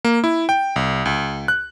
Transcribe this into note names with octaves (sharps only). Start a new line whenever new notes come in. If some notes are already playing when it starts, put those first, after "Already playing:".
A#3
E4
G5
C2
C#2
F#6